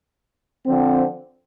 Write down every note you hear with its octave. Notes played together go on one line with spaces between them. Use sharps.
D3 F3 C4